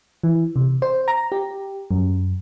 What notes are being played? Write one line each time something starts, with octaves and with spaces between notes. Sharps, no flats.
E3
C3
C5
A#5
G4
F#2